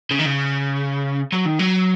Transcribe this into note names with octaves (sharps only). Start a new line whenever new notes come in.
C#3
D#3
C#3
F#3
D#3
F#3